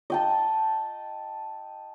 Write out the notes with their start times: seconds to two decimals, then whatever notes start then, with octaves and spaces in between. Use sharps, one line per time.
0.10 D#5 G5 A5